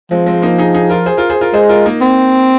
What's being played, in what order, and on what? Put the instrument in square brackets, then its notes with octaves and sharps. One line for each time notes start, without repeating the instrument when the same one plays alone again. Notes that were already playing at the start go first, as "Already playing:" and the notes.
[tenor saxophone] F3 [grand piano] G#3 C4
[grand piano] G#3 C4
A#3 D#4
D#4 G#4
D#4 G#4
F4 A#4
G#4 C5
F4 A#4
G#4 C5
F4 A#4
[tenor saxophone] G#3 [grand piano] G#4 C5
[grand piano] F4 A#4
A#3 D#4
[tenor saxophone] C4